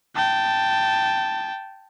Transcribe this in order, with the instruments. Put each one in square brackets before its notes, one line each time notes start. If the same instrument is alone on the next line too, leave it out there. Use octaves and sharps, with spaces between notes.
[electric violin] G5 A5